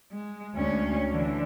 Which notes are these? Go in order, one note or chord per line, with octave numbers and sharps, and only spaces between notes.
G#3
D2 C#4
D3 E3